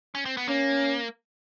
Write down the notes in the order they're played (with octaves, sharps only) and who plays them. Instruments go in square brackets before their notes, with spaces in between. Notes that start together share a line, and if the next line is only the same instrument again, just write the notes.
[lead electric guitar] C#4
C4
B3
[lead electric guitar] A#3 [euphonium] C#4